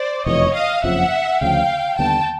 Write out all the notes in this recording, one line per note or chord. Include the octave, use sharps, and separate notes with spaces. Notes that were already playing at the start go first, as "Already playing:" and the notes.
Already playing: C5 D5
F1 E2 B2 C#5 D#5
D#5 F5
F#1 F2 C#3 F3 E5 F#5
D2 C#3 F3 F5 G5
D#2 D3 G3 B3 G5 A5